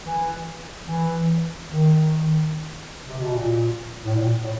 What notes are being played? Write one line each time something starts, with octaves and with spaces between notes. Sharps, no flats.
E3
E3
D#3
C3
B2
A#2
A2
A#2
A2